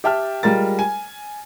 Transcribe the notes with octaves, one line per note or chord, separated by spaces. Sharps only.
G4 E5 G5 A5 F6
G3 G#3 F4 A#4 A6
G#5